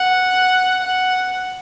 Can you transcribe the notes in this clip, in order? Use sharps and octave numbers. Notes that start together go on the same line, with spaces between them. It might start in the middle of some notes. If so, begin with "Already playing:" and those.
Already playing: F#5
F#5